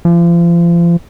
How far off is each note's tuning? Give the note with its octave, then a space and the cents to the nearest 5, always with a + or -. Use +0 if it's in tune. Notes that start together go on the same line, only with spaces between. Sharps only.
F3 -35